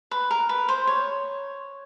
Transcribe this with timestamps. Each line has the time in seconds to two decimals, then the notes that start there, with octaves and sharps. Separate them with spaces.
0.11 B4
0.31 A#4
0.49 B4
0.69 C5
0.87 C#5